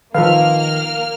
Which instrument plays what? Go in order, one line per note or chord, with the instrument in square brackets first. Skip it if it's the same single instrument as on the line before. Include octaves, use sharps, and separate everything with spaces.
[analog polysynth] D#3 [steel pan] F3 A4 B4 [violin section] A#3 F6 [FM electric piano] F5